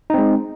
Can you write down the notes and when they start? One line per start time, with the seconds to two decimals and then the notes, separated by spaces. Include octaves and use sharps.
0.10 D#4
0.14 C4
0.18 G#3